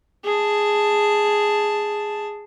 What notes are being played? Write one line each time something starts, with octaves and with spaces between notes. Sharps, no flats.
G#4 A5